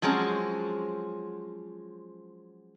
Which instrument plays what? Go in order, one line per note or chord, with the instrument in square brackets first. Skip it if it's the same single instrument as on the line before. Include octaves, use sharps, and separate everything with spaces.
[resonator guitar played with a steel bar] F3 F#3 G#3 C4 C#4 G#4